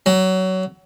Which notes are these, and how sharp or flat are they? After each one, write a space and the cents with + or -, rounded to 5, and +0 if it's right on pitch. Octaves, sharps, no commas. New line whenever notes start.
F#3 +20